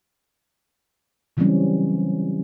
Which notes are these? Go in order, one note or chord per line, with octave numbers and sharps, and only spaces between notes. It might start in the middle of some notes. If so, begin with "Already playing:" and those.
C#3 E3 F#3 G3 C4 C#4